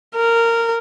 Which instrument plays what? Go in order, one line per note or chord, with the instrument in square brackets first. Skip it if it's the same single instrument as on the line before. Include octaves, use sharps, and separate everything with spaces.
[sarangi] A#4